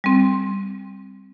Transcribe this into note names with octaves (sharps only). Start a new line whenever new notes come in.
G3 C4